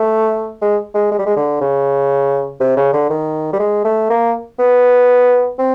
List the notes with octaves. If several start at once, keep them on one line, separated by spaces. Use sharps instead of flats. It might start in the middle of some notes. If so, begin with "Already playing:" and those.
Already playing: A3
G#3
G#3
G#3
G3
G#3
D3
C#3
C3
C#3
D3
D#3
G3
G#3
A3
A#3
B3
C4